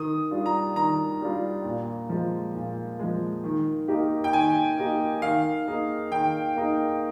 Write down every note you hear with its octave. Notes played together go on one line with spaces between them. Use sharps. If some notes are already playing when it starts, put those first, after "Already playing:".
Already playing: D#3 D#6
G3 D4 F4
A#5
D#3 A#5
G3 D4 F4
A#2
F3 G#3
A#2
F3 G#3
D#3
A#3 D#4 G4
G5
D#3 G#5
A#3 D#4 G4
D#3 F5
A#3 D#4 G#4
D#3 G5
A#3 D#4 G#4